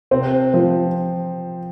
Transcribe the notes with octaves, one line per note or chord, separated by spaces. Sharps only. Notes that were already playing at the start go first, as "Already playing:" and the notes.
C3 C4
F3